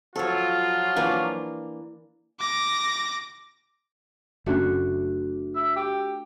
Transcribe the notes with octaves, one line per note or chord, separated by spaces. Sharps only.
F3 F#3 F4 A4 C#5
E3 A#3 D4
D6 A#6
F#1 A#2 A3 C#4 D4 F#4
E5
G4